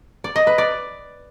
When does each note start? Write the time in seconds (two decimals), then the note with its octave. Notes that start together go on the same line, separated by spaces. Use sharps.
0.24 D5
0.36 D#5
0.47 B4
0.58 D5